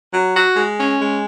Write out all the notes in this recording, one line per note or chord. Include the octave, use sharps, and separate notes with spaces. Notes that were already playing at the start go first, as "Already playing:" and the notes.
F#3
F#4
G#3
C#4
G#3